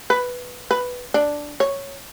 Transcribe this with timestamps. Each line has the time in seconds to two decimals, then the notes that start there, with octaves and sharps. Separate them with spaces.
0.10 B4
0.71 B4
1.14 D4
1.60 C#5